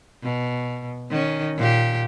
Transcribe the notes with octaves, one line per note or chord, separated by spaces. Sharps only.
B2
D#3 C#4
A#2 G4